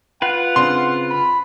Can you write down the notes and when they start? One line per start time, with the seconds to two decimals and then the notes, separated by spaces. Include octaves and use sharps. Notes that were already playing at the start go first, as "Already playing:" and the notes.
0.22 F4 B4 F#5
0.56 C#3 C4 D4 C6
1.09 B5